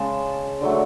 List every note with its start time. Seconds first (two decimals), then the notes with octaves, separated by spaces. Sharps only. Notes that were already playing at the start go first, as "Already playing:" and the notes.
Already playing: C#3 G#3 A5
0.61 D3 F#3 A3